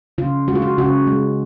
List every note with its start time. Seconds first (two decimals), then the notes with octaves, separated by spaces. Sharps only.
0.18 C#3 F4
0.48 G#3 F#4
0.55 F4
0.62 F#4
0.78 C#3 F#4
1.07 G#3